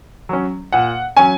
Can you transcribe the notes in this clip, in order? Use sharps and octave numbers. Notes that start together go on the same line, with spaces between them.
F#3 C#4
A#2 F#5
F#3 C#4 G#5